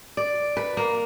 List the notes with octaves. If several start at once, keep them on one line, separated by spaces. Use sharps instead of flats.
D5
B4
A#3